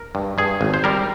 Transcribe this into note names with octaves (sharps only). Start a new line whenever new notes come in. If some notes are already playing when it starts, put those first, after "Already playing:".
Already playing: A#4
G2
G2 G#4
G#1
C5
G3 A#4